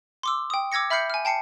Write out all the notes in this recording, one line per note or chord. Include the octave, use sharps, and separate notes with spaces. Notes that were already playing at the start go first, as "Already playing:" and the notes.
C6 D6 E6
G5 D#6
D6 E6 G#6 A#6 C#7
E5 B5 F6 G6 C7 C#7
G#5 F6
G5 A5 C7 C#7